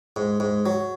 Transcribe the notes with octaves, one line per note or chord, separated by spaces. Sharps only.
G#2
G#2
F#3